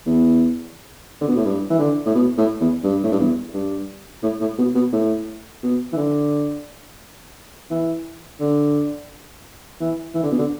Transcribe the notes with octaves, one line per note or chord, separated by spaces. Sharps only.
E2
D3
B2
A2
G2
E3
D3
A2
B2
A2
E2
G2
A2
G2
E2
G2
A2
A2
B2
B2
A2
B2
E3
D3
E3
D3
E3
E3
D3
B2
D3